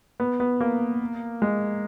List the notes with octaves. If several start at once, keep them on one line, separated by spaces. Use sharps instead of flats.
B3
B3
A#3
G#3